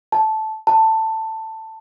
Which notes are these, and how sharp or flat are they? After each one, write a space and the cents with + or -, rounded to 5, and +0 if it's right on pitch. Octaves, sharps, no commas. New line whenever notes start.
A5 -10
A5 +15